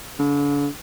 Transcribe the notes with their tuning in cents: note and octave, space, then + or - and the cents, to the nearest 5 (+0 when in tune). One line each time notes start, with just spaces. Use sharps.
D3 -40